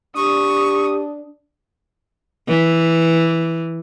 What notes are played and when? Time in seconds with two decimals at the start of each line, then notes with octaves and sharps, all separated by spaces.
0.16 D4 G4 C#6 D#6
2.48 E3